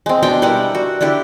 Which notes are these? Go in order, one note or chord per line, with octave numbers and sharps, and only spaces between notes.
G#3 C4
B2 D4 G5
G3 E4 A#4 F#5
F#4
D3 D4 E4 G4